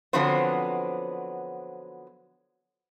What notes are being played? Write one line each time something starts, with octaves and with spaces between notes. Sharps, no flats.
D3 F3 F#3 B3 C4 C5